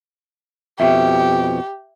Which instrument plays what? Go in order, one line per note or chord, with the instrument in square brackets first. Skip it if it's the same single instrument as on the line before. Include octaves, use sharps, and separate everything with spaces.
[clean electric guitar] F2 B2 [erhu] G4 [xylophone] E5